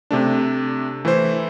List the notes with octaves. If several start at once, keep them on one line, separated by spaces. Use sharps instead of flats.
C3 A3 D4
E3 A3 E4 C5